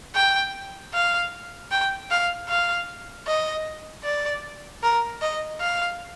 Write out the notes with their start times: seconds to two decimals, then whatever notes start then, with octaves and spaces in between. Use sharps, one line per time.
0.15 G5
0.94 F5
1.72 G5
2.11 F5
2.49 F5
3.27 D#5
4.04 D5
4.83 A#4
5.21 D#5
5.60 F5